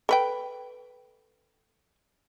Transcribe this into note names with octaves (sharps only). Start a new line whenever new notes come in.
A4 B4 G5